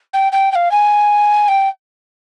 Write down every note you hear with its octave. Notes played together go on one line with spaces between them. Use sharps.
G5
G5
G5
F5
G#5
G5